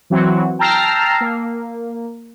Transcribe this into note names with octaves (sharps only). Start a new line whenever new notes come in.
E3 F#3 C4 F#4
G5 A5 A#5 E6 F6 C7
A#3